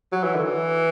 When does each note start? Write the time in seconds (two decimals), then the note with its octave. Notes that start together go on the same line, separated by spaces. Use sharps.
0.13 F#3
0.23 E3
0.34 D3
0.45 E3